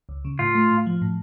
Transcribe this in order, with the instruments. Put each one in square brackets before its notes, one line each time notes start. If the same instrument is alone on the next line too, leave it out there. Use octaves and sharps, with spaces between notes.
[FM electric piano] C#2
C#3
[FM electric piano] A2 [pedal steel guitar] F4
[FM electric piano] A3
A2
F3
A2